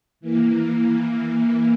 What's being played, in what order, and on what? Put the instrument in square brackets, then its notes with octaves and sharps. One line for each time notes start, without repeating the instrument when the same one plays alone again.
[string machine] E3 A#3